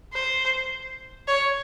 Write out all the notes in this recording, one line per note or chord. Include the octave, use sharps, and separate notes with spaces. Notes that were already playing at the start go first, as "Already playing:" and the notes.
C5
C#5